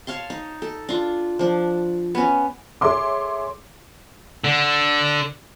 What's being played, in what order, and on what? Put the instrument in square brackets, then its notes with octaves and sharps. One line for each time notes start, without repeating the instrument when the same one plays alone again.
[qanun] C#5 F5 A5 C6
D#4
A4
D4 F4
F3 D4
B3 C#4
[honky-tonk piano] G#4 A4 C#5 E5 C6 D6
[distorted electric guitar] D3